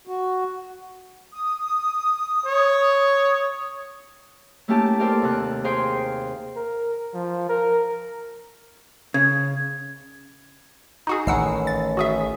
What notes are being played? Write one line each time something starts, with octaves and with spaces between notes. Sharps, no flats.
F#4
D#6
C#5
A3 A#3 C#4 E4 G4 A5
G4 A4 A#4 C5 D5 F5
D#2 C3 F#6
G#4 A#4 C5 F5 G5 C6
A#4
F3
A#4
C#3 G#6
D#4 F#4 G#4
A1 D#3 F#5 E6 C7
A6
F#4 G#4 E5